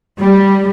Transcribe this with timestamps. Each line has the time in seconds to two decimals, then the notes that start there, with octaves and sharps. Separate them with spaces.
0.19 G3